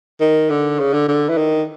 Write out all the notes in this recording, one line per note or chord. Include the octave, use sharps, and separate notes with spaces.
D#3
D3
C#3
D3
D3
E3
D#3